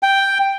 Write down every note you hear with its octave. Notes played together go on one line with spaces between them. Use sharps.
G5